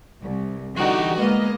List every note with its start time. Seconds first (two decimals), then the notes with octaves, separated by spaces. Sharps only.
0.22 C2
0.75 D3 E3 G3 D#4 F#4 G4
1.16 G#3 A#3 B3 D#5